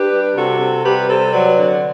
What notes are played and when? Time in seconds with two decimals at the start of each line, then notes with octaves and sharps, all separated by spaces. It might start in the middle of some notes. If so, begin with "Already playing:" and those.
Already playing: D4 G4 B4
0.12 G3
0.36 C3 F#4 A4
0.60 C3
0.84 G3 G4 B4
1.08 C3 A4 C5
1.32 F#3 B4 D5
1.57 D3